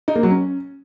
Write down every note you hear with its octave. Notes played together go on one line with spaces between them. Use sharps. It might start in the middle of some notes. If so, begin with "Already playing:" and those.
D#4
A#3
F#3
C#4